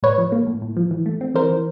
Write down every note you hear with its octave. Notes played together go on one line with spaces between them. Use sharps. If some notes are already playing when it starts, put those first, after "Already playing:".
A2 B4 C#5
F3
A#3
A2
A2
F3
E3
A3
C4
E3 A#4 C5
E3